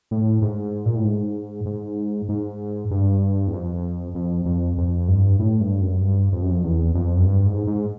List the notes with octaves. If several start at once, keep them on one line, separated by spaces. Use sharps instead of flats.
A2
G#2
A#2
A2
G#2
G#2
G#2
G2
E2
F2
F2
F2
F2
G2
A2
G2
F#2
G2
F2
F#2
F2
E2
F2
F#2
G2
G#2
G#2